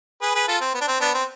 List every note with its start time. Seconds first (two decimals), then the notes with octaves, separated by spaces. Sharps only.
0.22 G#4 B4
0.35 G#4 B4
0.48 F4 A4
0.61 C4
0.74 B3
0.81 D4
0.88 C4
1.00 B3 D4
1.14 C4